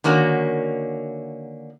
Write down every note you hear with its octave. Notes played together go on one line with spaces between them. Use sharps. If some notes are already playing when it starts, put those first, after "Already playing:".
D3 D#3 A#3 C#4 F#4